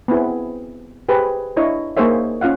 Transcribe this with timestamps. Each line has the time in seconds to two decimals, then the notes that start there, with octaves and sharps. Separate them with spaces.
0.08 B3 C4 E4 G#4
1.09 G4 G#4 B4 C5
1.57 D4 E4 C#5 D#5
1.97 A#3 D#4 G#4 C5 C#5 E5
2.41 C#4 F4 F5 F#5